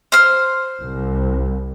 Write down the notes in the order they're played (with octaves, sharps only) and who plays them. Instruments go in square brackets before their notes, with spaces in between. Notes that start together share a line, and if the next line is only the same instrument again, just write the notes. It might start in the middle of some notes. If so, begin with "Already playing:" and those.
[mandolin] C5 F6
[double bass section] C2